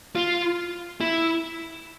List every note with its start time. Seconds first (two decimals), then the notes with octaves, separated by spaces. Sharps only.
0.16 F4
1.01 E4